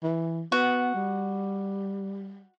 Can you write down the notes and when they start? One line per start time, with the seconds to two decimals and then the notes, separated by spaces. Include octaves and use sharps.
0.03 E3
0.52 B3 F#4
0.95 G3